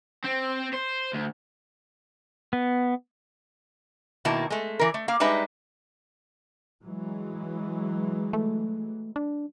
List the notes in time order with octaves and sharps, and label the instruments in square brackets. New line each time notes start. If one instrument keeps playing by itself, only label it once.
[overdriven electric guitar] C4
C5
D2
[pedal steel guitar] B3
[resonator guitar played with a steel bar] B2 D#3 A#3 E4 A5
G#3 A3
E3 A#4
A3
A#3 F5
G3 G#3 D#4 B4 E5
[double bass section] E3 F#3 G#3
[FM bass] A3
D4